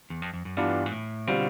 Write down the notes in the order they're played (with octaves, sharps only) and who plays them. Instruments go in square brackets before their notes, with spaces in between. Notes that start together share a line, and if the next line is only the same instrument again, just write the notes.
[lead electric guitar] E2
F2
F2
F#2
[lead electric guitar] G2 [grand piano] E3 G3 B3 D4 F4
[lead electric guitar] G#2
A2
[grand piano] B2 G3 C4 F4 [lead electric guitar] D3